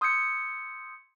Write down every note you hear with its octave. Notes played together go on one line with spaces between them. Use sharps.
C6 D#6 E6 G6 G#6 C#7